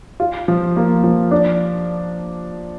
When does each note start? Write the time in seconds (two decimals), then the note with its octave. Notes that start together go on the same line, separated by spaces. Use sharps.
0.20 F4
0.48 F3
0.76 A#3
1.04 F3
1.31 D4